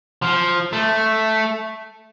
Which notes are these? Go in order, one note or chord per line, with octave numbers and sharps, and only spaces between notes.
F3
A3